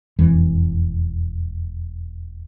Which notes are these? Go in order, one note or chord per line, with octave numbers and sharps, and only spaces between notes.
E1 F2 E3